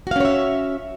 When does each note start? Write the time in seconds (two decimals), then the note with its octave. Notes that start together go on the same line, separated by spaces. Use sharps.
0.07 F#4
0.11 F5
0.16 C#4
0.20 C#5
0.25 E5